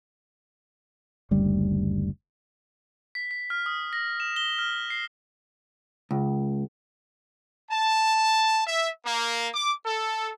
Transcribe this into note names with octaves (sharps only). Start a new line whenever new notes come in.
F#1 D2 G3
B6
B6
F6
D#6
A#6
E7
G7
F6
C7
C#2
A5
E5
A#3
D6
A4